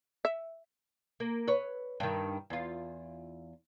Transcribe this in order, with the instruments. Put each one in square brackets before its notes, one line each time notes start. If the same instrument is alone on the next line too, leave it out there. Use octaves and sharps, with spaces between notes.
[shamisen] E5
[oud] A#3
B4 C#5
G2 D#3
E2 F4